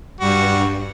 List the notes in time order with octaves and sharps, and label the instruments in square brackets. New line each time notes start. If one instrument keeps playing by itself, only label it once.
[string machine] G2 [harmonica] G3 F#4